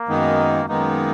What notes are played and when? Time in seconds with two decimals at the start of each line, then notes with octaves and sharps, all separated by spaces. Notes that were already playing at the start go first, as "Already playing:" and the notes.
Already playing: A#3
0.08 F#2 D#3 G#3 B3 D#4
0.68 F#2 D#3 G#3 A#3 B3 D#4